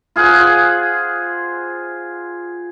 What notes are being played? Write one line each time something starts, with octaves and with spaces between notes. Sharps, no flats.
F4 G#4 C5 F#5